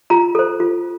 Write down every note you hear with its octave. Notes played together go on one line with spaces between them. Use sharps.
F4 A#5
A4 C5
F4